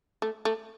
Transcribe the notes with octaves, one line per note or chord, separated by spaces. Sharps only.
A3
A3